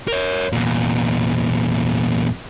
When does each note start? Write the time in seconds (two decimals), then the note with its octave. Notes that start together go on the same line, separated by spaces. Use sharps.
0.08 A#4 C#5
0.53 E2 A#2